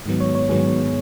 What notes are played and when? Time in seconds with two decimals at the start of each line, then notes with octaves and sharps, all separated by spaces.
0.06 G#2 D#3 F#3 B3
0.20 C#5
0.35 C#5
0.49 G#2 D#3 F#3 B3 G#4